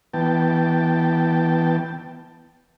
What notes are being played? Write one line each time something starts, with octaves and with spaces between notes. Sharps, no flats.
E3 B3 G5 A5